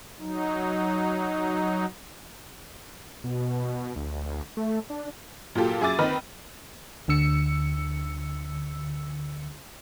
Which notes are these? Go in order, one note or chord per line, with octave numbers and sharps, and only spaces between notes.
F#3 D#4
B2
D2
A3
D4
A#2 F#3 A#3 F4 G4 A4
F#2 G#4 E5 G#5 D6 A6
D#3 C4 B4 D#5 B5 F6
D2 D3 E6 C#7